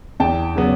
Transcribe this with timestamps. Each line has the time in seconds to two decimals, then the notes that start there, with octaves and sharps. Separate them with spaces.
0.20 E2 G5 A5
0.56 C#3 F#3 B3